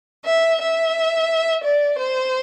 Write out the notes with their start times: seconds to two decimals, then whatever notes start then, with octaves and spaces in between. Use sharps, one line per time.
0.26 E5
0.61 E5
1.64 D5
1.98 C5